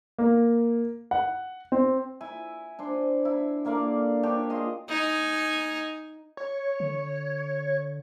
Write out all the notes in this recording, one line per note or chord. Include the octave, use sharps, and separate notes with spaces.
A#3
F#5
C4
E4 G#5
D4 C5
E4
D3 A#3 D5 F5
D4 G4 C#5
F4 G#4 D#5
D#4 G#5
C#5
D3